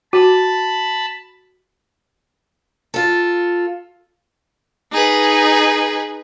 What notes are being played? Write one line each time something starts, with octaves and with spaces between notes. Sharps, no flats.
F#4 A5 B5
F4 A4
D#4 G#4 B4